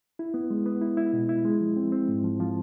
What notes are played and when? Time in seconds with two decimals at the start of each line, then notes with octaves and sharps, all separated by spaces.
0.19 E4
0.34 B3
0.50 G#3
0.66 B3
0.82 E4
0.97 E4
1.13 B2
1.29 E4
1.45 G#3
1.61 F3
1.76 C4
1.92 C4
2.08 G#2
2.24 F3
2.40 F3